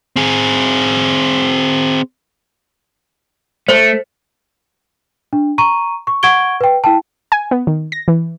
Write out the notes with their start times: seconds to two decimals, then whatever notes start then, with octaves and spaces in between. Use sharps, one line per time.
0.16 C4 G#4
3.68 A3 C5
5.33 D4
5.58 A#5 C#6 D#7
6.07 C#6
6.23 F#5 C#6 G#6 D7 G7
6.61 B4 G5
6.84 E4 G5 A5
7.32 G#5
7.51 B3
7.67 D#3
7.92 A#6
8.08 E3